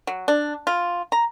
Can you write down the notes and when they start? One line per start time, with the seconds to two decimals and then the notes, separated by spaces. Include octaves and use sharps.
0.07 F#3
0.28 D4
0.67 F4
1.12 A#5